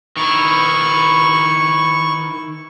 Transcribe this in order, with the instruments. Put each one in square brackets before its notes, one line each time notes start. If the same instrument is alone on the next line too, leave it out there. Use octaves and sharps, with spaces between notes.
[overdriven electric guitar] D#3 E4 [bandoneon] C#6